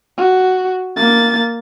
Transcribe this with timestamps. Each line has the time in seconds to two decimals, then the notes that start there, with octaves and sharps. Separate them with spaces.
0.18 F#4
0.96 A#3 A6